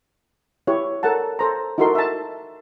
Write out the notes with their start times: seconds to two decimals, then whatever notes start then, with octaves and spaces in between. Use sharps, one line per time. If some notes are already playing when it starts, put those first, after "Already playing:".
0.67 E4 G4 C#5
1.03 A4 A#4 F#5 A5
1.39 A4 C5 A#5
1.78 D#4 E4 F#4 A4 A#4 C6
1.95 E5 A5